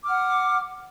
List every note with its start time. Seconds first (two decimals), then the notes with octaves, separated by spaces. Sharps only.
0.03 D6
0.05 F6
0.08 F#5